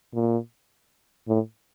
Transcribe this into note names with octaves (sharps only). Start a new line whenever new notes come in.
A#2
A2